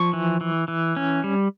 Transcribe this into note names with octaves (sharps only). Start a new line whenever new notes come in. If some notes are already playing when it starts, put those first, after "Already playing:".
Already playing: F3 C#6
E3
E3
E3
C#4
G3